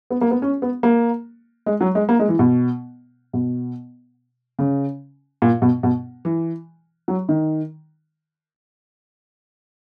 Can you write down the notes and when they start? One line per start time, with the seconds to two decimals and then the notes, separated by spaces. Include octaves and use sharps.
0.10 B3
0.21 A#3
0.31 B3
0.42 C#4
0.62 B3
0.83 A#3
1.66 G#3
1.81 F#3
1.95 G#3
2.09 A#3
2.19 G#3
2.29 E3
2.39 B2
3.33 B2
4.59 C#3
5.42 A#2
5.62 B2
5.83 B2
6.25 E3
7.08 F#3
7.29 D#3